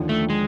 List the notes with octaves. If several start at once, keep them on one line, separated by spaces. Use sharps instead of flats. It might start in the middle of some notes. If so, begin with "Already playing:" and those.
Already playing: D#2 D3 F3
A3
G#3